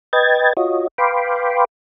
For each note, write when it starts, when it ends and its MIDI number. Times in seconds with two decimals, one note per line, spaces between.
0.13 0.53 71
0.13 0.53 75
0.13 0.53 79
0.13 0.53 92
0.13 0.53 93
0.57 0.87 65
0.57 0.87 66
0.57 0.87 73
0.57 0.87 75
0.98 1.65 71
0.98 1.65 77
0.98 1.65 79
0.98 1.65 83
0.98 1.65 84
0.98 1.65 86